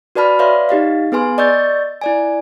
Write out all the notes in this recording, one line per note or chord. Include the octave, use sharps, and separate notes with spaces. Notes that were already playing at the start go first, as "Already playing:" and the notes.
F#4 B4 D5 A5 B5 F6
B4 C#5 D5 E5 F5 C6
D#4 G4 D#5 F5
B3 G#4 B4 G#5 C6
D5 D#5 C#6 E6 G6 A6
E4 D5 G#5